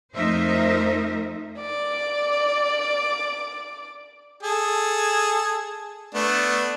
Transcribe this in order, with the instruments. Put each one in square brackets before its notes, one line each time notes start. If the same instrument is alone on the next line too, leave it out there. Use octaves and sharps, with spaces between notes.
[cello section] F2 A3 D#4 A#4 C5 E5
[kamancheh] D5 D6
[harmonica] G#4 A4
A3 B3 D4